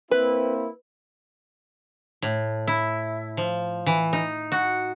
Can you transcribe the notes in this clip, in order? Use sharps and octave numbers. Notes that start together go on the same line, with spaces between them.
A#3 C4 E4 B4
A2
E4
F3
E3
D#4
F#4